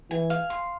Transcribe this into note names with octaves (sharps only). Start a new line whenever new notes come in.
E3 G#5
F5
C6